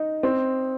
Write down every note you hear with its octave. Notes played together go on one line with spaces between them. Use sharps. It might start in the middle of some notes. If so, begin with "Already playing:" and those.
Already playing: D#4
C4